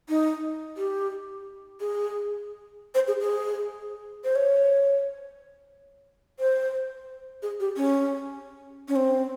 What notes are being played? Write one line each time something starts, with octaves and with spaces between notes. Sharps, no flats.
D#4
G4
G#4
C5
G#4
G#4
C5
C#5
C5
G#4
G4
C#4
C#4
C4